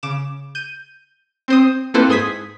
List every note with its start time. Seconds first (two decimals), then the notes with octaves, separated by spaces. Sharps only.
0.03 C#3 D6 E7
0.55 G6 D#7
1.48 C4 C5 D#6
1.94 A#3 C4 E4 A4 B4 C5
2.09 G#2 G#4 C6 D#6 G#6 B6